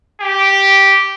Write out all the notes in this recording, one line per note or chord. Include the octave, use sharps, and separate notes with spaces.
G4